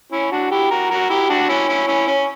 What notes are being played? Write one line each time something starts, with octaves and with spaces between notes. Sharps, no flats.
C#4 E4
D4 F#4
E4 G4
F#4 A#4
F#4 A#4
E4 G4
D4 F#4
C#4 E4
C#4 E4
C#4 E4
C#4